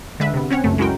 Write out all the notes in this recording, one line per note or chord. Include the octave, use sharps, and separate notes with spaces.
D3 G#3 B4 E5
C3 B3
C4 C#4 C#5 F#5
C#2 F#2 A3
G#3 C#4 E4 F#4 A#4 G5